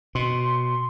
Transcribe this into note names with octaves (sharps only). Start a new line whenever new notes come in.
B2 C6